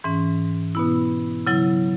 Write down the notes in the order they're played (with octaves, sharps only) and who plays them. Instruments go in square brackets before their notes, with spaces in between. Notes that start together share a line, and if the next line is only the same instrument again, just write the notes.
[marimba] G#2 E3 C#4
B2 B3 E4
C#3 F#3 E4